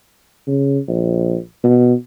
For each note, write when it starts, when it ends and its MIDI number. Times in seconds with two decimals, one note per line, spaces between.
0.47 0.78 49
0.88 1.37 34
1.63 1.93 47